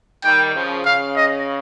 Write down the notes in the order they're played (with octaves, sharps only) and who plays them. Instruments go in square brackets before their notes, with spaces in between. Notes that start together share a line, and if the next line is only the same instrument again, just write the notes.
[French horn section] D#3 G3 [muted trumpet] G5
[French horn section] C#3 F3
[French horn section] C#3 [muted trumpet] F5
[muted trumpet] D#5